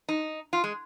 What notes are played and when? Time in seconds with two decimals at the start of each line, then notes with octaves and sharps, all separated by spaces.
0.09 D#4
0.53 F4
0.64 G#3